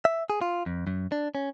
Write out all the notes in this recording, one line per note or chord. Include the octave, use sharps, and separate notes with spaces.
E5
G#4
F4
F2
F#2
D4
C#4